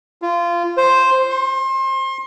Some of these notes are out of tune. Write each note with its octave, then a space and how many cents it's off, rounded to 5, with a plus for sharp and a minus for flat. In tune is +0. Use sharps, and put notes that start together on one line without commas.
F4 -20
C5 +0
C6 +35